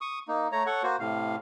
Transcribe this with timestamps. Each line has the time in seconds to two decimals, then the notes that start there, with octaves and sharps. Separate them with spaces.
0.01 C#6 D#6
0.28 A#3 D#4
0.52 A3 C#5 A#5
0.66 A4 C#5 F#5 C#6
0.83 A#3 F#4 C5
1.00 A2 C3 F5